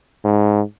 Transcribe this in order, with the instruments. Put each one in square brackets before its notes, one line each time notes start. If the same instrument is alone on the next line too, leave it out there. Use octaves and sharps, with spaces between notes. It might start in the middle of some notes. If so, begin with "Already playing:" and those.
[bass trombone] G#2